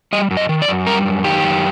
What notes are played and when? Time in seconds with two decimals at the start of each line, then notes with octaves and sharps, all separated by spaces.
0.13 G3 D#5
0.31 F#2
0.37 D#5
0.49 D#3
0.62 D5
0.68 F#2
0.87 G3 A#4
1.05 F#2
1.24 D#3 G4
1.43 F#2